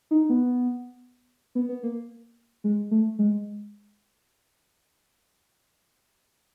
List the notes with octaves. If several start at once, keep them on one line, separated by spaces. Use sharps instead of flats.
D#4
B3
B3
B3
A#3
G#3
A3
G#3